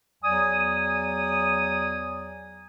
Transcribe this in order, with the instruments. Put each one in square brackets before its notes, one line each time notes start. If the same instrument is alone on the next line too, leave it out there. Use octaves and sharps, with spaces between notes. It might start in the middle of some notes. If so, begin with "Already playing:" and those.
[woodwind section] E2 F#3 D5 G#5 D#6